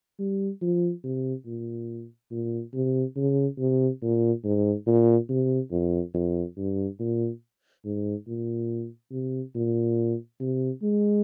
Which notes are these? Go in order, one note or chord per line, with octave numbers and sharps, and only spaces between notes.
G3
F3
C3
A#2
A#2
C3
C#3
C3
A#2
G#2
A#2
C3
F2
F2
G2
A#2
G#2
A#2
C3
A#2
C3
G#3